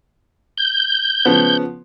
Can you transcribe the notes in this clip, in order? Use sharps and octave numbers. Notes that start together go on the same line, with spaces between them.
G6
C#3 F3 B3